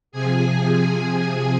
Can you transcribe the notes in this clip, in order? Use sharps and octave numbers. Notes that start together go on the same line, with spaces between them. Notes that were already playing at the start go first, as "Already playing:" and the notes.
C3 F3 G#4 G#5
G#4 G#5
G#4 G#5